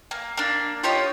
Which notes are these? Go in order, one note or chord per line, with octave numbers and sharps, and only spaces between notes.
A#3
A#3 D4
F4 G4 C#5 D#5